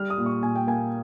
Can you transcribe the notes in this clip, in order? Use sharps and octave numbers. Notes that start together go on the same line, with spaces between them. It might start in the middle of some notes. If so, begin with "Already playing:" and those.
Already playing: G3 F6
D#6
A#2
C#6
A#2 G#5
G5
A#3 G#5